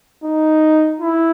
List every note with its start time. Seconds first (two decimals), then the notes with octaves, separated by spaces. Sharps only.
0.24 D#4
1.00 E4